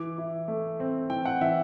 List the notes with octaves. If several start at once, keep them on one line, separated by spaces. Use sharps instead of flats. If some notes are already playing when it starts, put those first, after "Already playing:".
Already playing: E3 D6
E4
A3
C4
E3 G5
F#5
E3 E5